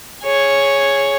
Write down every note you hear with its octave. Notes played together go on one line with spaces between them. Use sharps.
G#4 C#5